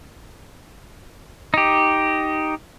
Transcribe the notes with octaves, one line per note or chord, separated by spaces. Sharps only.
D#4 G4